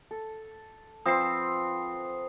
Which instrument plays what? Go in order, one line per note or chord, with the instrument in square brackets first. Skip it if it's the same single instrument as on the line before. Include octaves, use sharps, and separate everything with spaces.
[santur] A4
[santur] F3 B4 F#5 [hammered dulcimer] C4 [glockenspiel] D#6 C7